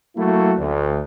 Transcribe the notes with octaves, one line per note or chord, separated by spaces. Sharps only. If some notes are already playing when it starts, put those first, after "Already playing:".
F#3 A3 A#3 E4 F#4
D2